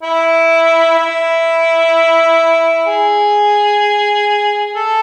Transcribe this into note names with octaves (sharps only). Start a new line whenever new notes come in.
E4
E4
G#4
A4